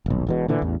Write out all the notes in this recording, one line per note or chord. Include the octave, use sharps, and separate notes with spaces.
D#1 B1
E1 E2 B2
A#2 D3 E3
A1 E2